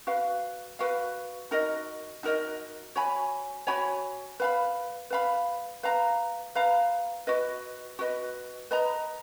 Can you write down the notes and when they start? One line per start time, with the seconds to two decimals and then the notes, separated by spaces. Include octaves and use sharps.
0.07 F#4 B4 F5
0.79 F#4 B4 F5
1.51 D#4 F#4 A#4 D#5
2.23 D#4 F#4 A#4 D#5
2.95 F#4 C#5 G#5 B5
3.67 F#4 C#5 G#5 B5
4.40 B4 F5 B5
5.10 B4 F5 B5
5.83 B4 F5 A#5
6.55 B4 F5 A#5
7.27 F#4 B4 D#5
7.99 F#4 B4 D#5
8.71 B4 D#5 A#5